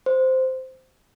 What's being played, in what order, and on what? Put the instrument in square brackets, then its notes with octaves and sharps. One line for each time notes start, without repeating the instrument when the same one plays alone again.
[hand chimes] C5